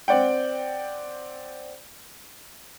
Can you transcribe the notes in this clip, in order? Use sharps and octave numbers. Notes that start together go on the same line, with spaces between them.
C4 D5 F#5 G5